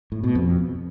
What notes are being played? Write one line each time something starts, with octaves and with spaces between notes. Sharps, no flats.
A2
B2
F2